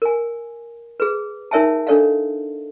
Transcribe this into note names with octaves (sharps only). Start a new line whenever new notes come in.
A#4 G#5
G#4 B4
D#4 A#4 C#5 E5 G#5 A5
D4 A4 C#5 D#5 F5